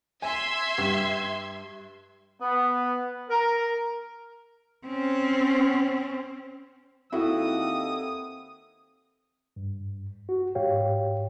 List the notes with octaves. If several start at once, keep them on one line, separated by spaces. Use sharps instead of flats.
E5 G#5 C6 G#6
G2
B3
A#4
C4 C#4
D#2 C4 E4 F#4 A4 D#6
G2
F#4
G#2 G4 C#5 F5 G5